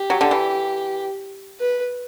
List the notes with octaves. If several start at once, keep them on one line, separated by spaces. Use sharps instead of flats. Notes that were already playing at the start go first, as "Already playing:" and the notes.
Already playing: G4
F#3
D3
E3
B4